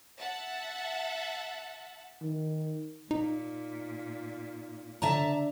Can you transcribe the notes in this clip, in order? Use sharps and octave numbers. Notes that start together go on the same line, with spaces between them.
E5 F#5 A5
D#3
A#2 D#4
D3 E5 A5 A#5